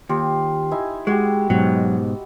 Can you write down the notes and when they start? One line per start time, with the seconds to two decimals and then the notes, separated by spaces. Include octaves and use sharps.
0.09 D#2 F4 G4
0.71 D#4 E4 G#5
1.07 G#3 F#4 G4
1.50 G#2 B2 F#3